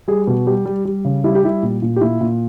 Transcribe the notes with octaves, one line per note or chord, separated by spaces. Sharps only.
G3 G#4
B2
G3 G4
G3
G3
C#3
G3 E4
G4
G3 E4
A#2
A#2
G4
A#2 E4
A#2